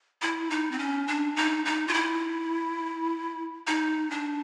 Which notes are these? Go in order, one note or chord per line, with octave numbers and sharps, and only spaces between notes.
E4
D#4
C4
C#4
D4
D#4
D#4
F4
E4
D#4
D4